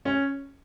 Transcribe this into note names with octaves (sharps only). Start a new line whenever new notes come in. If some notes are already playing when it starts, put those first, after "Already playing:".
C#4